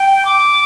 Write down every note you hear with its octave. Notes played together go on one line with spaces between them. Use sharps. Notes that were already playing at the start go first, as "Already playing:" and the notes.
Already playing: G5
D6